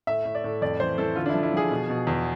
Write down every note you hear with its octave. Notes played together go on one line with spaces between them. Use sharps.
A2 E5
A2
D5
A2
F2 D5
E3 C5
E3 A4
D3 F4
D4
F3 E4
E4
F3 G#4
B2
B2
E2